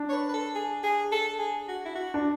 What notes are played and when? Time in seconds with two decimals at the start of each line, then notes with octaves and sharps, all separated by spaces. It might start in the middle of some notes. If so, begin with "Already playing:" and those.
Already playing: D4
0.09 C#5
0.13 B4
0.29 B4
0.34 A4
0.55 G#4
0.83 G#4
1.12 A4
1.39 G#4
1.68 F#4
1.85 E4
1.95 F#4
2.14 D4